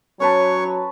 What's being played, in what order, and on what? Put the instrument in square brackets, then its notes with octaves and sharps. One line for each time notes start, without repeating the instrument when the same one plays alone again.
[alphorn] F#3 [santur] C#4 B4 A5 [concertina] C#5